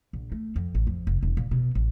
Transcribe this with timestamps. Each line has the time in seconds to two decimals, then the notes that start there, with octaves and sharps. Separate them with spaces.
0.13 A#1
0.32 A3
0.56 F2
0.75 A1
0.87 F2
1.07 F1
1.23 E1
1.37 A#2
1.51 B2
1.75 A1